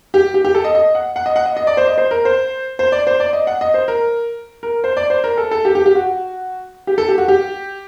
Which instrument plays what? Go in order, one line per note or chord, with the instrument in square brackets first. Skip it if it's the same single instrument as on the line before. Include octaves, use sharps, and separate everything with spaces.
[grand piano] G4
G4
G4
A4
D#5
D#5
F#5
F#5
D#5
F#5
D#5
D#5
D5
C5
D#5
C5
A#4
C5
C5
D5
C5
D5
D#5
F#5
D#5
C5
A#4
A#4
C5
D5
C5
A#4
A4
A4
G4
G4
G4
F#4
G4
A4
G4
F#4
G4